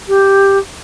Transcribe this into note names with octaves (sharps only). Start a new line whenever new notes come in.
G4